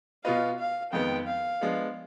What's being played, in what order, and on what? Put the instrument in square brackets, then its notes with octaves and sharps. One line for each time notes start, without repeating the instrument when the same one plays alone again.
[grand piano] B2 B3 F4 B4 D#5 [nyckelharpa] F5
[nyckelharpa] F5
[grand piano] F2 D#3 G#3 B3 [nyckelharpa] G5
[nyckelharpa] F5
[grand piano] F3 G#3 B3 D4